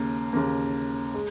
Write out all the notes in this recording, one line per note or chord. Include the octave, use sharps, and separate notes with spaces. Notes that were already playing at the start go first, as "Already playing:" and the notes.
Already playing: D#2 C#3 A#3
D#2 C#3 A#3
G#3